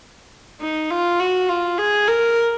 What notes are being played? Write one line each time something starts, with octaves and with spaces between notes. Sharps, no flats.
D#4
F4
F#4
F4
G#4
A#4